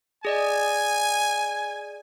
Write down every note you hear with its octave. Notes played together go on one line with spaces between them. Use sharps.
G#4 D5 D#5 G#5